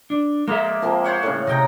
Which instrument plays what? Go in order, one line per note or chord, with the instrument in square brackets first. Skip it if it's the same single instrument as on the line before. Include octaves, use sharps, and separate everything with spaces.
[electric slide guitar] D4
[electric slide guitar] G#3 G#4 E5 [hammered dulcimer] A#3
[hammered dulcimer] F3 A#3 C4
C5 C#5 F#5
A2 C#3
[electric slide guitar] C3 [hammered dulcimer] D#5 G5 A#5